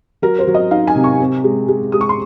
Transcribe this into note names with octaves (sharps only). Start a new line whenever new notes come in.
F#3 A#4
C5
F#3
D#5
D#4 F5
G#5
C3
C#6
C4
G#3
G#3
G#3 D#6
C#6
C6